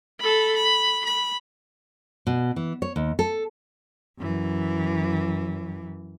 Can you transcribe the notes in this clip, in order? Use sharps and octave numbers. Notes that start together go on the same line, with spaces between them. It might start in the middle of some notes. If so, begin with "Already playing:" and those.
A4 B5
B5
B5
B2
E3
C#5
D#2
A4
F#2 E3